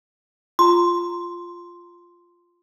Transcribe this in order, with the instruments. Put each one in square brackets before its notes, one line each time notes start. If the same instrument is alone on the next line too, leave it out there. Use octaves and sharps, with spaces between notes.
[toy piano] F4 A#5 [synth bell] C6